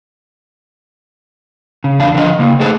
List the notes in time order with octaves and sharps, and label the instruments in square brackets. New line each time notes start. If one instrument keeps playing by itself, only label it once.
[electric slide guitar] C#3
E2 D4 F5
D3 F3 A#4 D#5
C#3 A#3
A3 D#4 G#4 A4 B4 C5